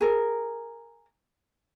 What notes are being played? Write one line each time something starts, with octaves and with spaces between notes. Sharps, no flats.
G#4 A#4